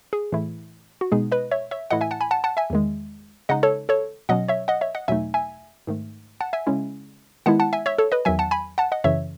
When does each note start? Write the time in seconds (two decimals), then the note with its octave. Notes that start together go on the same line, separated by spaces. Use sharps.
0.13 G#4
0.32 A2 E3 A3 E4
1.01 F#4
1.12 B2 G#3 B3 D#4 G#4
1.32 B4 D#5
1.51 C#5 E5
1.71 C#5 E5
1.91 A2 E3 A3 E4 D#5 F#5
2.01 E5 G#5
2.11 F#5 A5
2.21 G#5 B5
2.31 F#5 A5
2.44 F#5 A5
2.57 E5 G#5
2.70 E2 D#3 G#3
3.49 C#3 G#3 D#4 D#5 F#5
3.63 A4 C#5
3.89 A4 C#5
4.29 B2 F#3 C#4 D#5 F#5
4.48 C#5 E5
4.68 D#5 F#5
4.81 C#5 E5
4.95 D#5 F#5
5.08 E2 B2 F#3 A3 D#4 E5 G#5
5.34 E5 G#5
5.87 G#2 D#3 A3
6.40 F#5 A5
6.53 E5 G#5
6.67 C#3 G#3 C#4 E4
7.46 D#3 G#3 B3 E4 F#5 A5
7.60 F#5 A5
7.73 E5 G#5
7.86 C#5 E5
7.98 A4 C#5
8.12 B4 D#5
8.25 E2 D#3 F#3 E5 G#5
8.39 F#5 A5
8.51 G#5 B5
8.78 F#5 A5
8.92 D#5 F#5
9.04 F#2 C#3 E3 C#5 E5